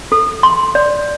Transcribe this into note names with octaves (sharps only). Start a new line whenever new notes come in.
A4
C6
D5